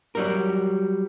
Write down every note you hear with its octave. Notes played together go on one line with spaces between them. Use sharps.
F#3 G3 A#4